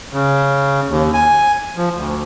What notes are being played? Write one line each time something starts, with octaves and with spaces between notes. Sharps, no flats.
C#3
D#2
G#5
F3
D2